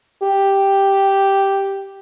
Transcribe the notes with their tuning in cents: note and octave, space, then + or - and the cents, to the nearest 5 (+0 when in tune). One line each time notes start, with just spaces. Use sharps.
G4 +0